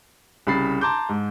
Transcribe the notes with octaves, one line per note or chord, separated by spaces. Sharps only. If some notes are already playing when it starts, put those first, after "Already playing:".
C2 C#3 B5 A6 C7
A5 A#5 C6 D6 G6
G#2